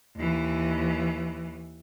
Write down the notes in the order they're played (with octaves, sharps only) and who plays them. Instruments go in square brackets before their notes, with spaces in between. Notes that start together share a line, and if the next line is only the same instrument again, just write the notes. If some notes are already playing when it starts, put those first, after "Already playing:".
[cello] D#2 E3